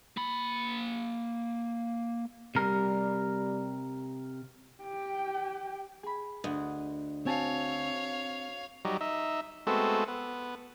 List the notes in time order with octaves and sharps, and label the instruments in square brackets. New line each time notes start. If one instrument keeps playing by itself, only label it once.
[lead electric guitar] A#3 B5
[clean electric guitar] C3 A#4 [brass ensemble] G3
[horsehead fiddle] G4 G5
[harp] G#4 B5
[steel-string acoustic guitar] D2 [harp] D#5 F#5
[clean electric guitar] C4 [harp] F#4 G#5 A5 [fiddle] C#5 F5
[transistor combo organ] F#3 G3 D#4
D#4 E5
G#3 A3 B3 C4 F#4 A4
B3